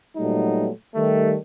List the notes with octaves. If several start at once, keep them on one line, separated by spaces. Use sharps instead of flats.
A#2 F#3 G3 A3 B3 D#4
D#3 G3 A3